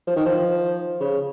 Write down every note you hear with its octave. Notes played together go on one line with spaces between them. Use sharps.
F3
D#3
F3
C#3